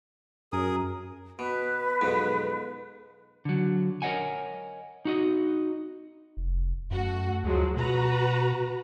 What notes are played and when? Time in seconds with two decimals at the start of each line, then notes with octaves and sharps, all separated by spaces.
0.52 F#2 G#4 A#4 D#6
1.39 B2 B4
2.01 B1 F2 G#2
3.45 D3 F#3
4.02 A#4 C#5 D#5 F#5 G#5
5.05 D#4 F#4 D#5
6.37 F1
6.91 F#2 A3 F#4
7.44 D2 F3 F#3 G#3
7.77 B2 F#4 B4 A#5